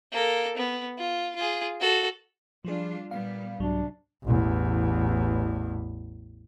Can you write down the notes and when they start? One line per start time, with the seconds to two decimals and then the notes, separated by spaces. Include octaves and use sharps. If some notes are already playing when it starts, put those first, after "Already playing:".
0.12 A#3 A4
0.57 B3
0.98 F4
1.36 F4 G#4
1.80 F#4 A4
2.65 F3 G3 D4 F4 G#4
3.11 A#2 G3 B3 F5
3.60 C2 G#2 C3 F#3 D4
4.23 A1 E2